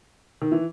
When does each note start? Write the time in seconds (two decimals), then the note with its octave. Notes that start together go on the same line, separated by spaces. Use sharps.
0.42 D#3
0.52 E3